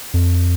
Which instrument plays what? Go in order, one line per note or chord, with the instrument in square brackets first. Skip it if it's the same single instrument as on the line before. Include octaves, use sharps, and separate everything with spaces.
[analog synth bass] F2